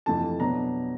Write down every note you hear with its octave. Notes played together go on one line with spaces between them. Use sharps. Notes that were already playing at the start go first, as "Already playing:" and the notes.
F2 C3 E3 A3 A5
B2 F#3 B3 D4 A#5